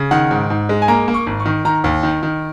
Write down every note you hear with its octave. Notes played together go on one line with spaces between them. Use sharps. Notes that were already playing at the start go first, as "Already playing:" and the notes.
Already playing: C#3
D#3 F#5
G#2
G#2
G#3
G#5
A#3 A#5
A#3
C#6
G#1
C#6
D#3
D#3 A#5
D#2
D#3
D#3